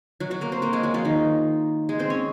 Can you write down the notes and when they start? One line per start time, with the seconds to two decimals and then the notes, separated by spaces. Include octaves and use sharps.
0.20 F#3 F#4
0.31 F#3 F#4
0.41 A#3 A#4
0.52 C4 C5
0.62 A#3 A#4
0.73 G#3 G#4
0.83 F#3 F#4
0.94 F3 F4
1.05 D#3 D#4
1.89 G#3 G#4
1.99 C4 C5
2.10 C#4 C#5